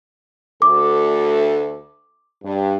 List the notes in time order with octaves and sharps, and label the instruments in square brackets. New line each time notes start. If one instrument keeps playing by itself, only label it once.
[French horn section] D2 A4 [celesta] D6
[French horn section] G2